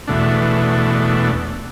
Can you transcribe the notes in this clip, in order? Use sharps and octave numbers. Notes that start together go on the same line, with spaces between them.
E2 B2 A3 D4